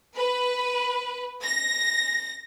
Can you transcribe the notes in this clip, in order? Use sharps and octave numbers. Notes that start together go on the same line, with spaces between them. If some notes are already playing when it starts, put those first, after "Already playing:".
B4
A#6